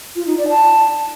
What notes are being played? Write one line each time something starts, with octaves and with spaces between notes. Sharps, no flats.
F4
D#4
D5
A5